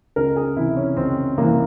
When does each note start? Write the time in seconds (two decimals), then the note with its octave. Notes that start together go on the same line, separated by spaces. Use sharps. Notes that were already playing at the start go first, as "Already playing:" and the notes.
0.16 C#2 A#4
0.36 G#4
0.56 C3 E3 E4
0.77 C#4
0.97 C#2 C4
1.38 C3 E3 A#3